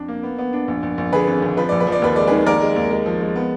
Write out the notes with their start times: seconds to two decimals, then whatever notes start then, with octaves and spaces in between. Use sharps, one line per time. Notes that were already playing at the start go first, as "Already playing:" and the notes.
Already playing: F2 D4
0.08 A#3
0.23 B3
0.39 B3
0.53 D4
0.68 A#1
0.83 A#1
0.98 A#1
1.13 D3 G#4 B4
1.28 G#1
1.42 G#1
1.57 F3 B4
1.69 A#1 D5
1.80 B4
1.87 F3
1.92 D5
2.02 D#2 B4
2.16 G#3 D5
2.27 G#4 B4
2.31 D#3
2.46 D#2 A#4 D5
2.61 G#3
2.76 D#2
2.91 G#3
3.06 F3
3.21 G#3
3.36 B3